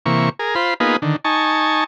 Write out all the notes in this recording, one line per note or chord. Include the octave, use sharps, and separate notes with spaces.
C3 E3 A#3 C#6
G#4 A#4
F4 C5 B5
A#3 B3 D#4 F4 G#4 B4
D3 D#3
D#4 G#5 A5 C#6